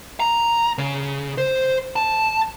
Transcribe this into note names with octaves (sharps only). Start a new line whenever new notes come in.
A#5
C#3
C5
A5